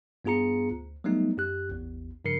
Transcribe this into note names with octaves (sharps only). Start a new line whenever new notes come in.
G2 B3 F4 G#4 A#5 C#7
D2
F#3 G3 A3 B3 D#4
F#2 G4 F#6
A1 E2
G2 C#3 F3 A#4 C7 C#7